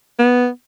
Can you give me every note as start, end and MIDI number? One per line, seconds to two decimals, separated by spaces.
0.19 0.48 59